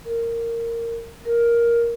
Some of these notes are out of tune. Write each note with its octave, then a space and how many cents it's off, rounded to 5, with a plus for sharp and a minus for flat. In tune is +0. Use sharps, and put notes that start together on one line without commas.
A#4 -10
A#4 +10